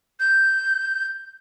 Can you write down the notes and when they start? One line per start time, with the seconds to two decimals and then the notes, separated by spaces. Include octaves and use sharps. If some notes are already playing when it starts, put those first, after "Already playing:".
0.20 G6